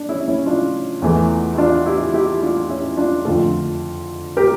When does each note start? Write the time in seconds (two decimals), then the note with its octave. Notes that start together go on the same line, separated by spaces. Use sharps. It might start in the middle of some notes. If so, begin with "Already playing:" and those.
Already playing: D4
0.09 C#4 E4
0.28 C#4 E4
0.46 D4 F4
1.02 E2 E3 A3
1.54 E4
1.58 D4 F4
1.86 E4 G4
2.14 E4 G4
2.41 D4 F4
2.69 C#4 E4
2.97 D4 F4
3.25 F2 D3 F3 A3 F4 A4
4.37 G4 A#4